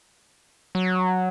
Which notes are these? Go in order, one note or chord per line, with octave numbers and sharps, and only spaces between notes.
F#3